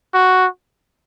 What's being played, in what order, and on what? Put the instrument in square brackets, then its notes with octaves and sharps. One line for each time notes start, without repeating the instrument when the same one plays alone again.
[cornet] F#4